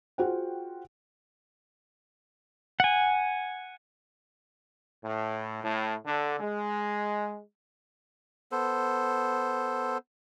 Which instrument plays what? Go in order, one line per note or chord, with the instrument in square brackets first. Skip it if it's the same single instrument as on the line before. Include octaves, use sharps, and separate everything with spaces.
[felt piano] F4 F#4 G#4 C5 F#5 G5
[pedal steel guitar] F#5 G#5
[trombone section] A2
A2
D3
G#3
[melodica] B3 A4 C5